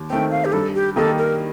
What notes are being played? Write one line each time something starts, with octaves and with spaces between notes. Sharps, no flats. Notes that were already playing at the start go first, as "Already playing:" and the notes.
Already playing: D#2
D#3 A3 C4 G5
F5
G4
G2 A4
G4
D#3 A#3 D#4 G4 A4
A#4